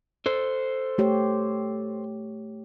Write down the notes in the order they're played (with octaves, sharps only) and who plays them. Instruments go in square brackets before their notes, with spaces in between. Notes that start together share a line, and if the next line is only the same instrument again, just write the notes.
[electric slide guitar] A4 C5
[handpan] A3 G4 C#5